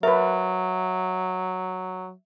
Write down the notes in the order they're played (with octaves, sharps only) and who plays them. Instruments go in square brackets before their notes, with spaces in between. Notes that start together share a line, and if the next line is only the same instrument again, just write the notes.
[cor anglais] F#3 [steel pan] A#4 B4 [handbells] E5